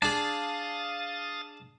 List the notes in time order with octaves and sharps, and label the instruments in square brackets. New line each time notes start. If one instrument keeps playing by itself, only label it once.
[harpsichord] D4 G#4 [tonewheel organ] F5 D#6 A6 [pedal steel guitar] A5